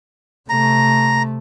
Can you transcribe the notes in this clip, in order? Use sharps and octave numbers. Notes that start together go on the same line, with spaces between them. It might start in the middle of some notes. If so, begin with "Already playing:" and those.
C3 A3 A#5